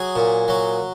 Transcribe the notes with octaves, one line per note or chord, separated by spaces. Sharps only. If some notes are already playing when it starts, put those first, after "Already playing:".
Already playing: F#3 G#4 G#5
A#2
F#3